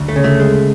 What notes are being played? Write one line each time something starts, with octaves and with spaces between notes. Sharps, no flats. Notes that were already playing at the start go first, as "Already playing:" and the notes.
Already playing: D2
A3
C#3
A3
G#3